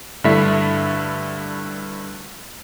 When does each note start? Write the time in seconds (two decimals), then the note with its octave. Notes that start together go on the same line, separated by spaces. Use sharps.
0.24 G2 D3 A3 E4 E5 B6